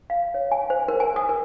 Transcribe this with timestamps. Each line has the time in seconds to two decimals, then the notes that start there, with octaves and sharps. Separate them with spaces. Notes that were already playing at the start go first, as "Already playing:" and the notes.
0.10 F5
0.34 C#5
0.52 G#5
0.70 C5
0.88 A#4
1.00 G#5
1.16 D#6
1.29 A#4